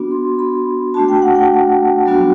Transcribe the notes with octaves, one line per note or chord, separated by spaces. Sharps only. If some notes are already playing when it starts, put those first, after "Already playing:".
Already playing: B3 D4 F#4
C6
B5
A3 D4 F#4 A5
G5
F#5
G5
F#3 B3 D4 F#4